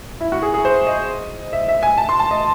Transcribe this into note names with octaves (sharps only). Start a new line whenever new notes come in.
E4
F#4
G#4
G#4
C5
D#5
E5
E5
G#5
A5
C6
A5
D#5